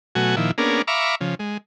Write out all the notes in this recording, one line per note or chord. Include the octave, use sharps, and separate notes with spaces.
B2 F#3 A3 F#4 G#5
A#2 D#3 F3 E4
A#3 B3 C#4 D4 G#4 A#4
E5 F5 A#5 B5 C#6 D6
C#3 F3
G#3